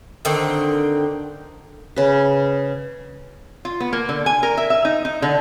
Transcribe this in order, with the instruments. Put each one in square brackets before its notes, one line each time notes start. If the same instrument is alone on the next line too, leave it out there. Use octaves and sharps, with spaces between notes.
[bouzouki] D3 D#3 C4
[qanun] C#3 B4
[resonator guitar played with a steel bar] F4
B3
A#3
D3
G#5
A#4
E5
E5
D#4
D#4
D3